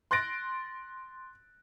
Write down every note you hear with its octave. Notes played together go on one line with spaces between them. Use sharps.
C6 F#6 A6 A#6 D7